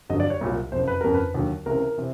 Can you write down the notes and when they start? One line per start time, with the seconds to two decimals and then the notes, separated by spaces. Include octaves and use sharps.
0.10 G1 F2 D3 F#3 D#5
0.20 D5
0.30 C#5
0.41 C2 A#2 F#3
0.72 F#1 F2 C3 C5
0.88 B4
1.01 G1 F2 C#3 A#4
1.14 B4
1.34 D#2 D3 F#3
1.66 C#2 C3 E3 A#4
1.98 C3 E3